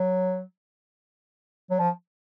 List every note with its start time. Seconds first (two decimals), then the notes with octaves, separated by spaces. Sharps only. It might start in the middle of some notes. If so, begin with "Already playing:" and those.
Already playing: F#3
1.70 F#3
1.79 F3